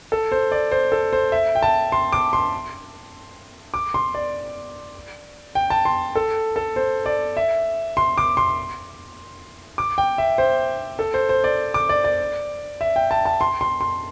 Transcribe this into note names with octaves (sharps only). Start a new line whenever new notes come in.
A4
C5
D5
C5
A4
C5
E5
G5
A5
C6
D6
C6
D6
C6
D5
G5
A5
C6
A4
A4
C5
D5
E5
C6
D6
C6
D6
G5
E5
C5
A4
C5
C5
D5
D6
D5
D5
E5
G5
A5
A5
C6
C6
C6